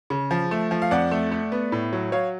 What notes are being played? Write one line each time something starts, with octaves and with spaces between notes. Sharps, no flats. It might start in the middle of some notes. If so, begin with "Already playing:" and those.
C#3
F3
A3
F3
F5
F2 D5 F#5
A3
A3
B3
A2
F#3
F#3 C#5 F5